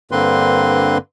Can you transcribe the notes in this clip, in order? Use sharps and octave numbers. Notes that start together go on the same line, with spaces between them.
G2 D3 A#3 C4 B4 C6